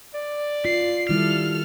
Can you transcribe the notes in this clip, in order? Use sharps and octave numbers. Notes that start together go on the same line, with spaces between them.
D5
F4 C7
D#3 G3 E4 A4 F6